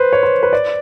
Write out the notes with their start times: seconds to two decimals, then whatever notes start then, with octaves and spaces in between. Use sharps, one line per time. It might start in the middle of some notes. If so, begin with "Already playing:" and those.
Already playing: B4 C5
0.13 C#5
0.23 C5
0.43 B4
0.53 D5